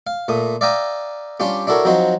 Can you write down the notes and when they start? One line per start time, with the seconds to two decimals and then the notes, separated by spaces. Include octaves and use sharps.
0.07 F5
0.28 A#2 A3 D#6
0.61 D5 E5 F5 G5 A#5 D#6
1.40 G3 C#4 D4 F4 G4
1.67 D4 E4 F#4 A4 A#4 C#5
1.85 F3 F#3 C4 D#4 F#4